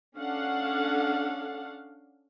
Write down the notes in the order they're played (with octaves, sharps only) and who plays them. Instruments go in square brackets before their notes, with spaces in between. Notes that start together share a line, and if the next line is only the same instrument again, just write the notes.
[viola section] C#4 D4 A4 F5 F#5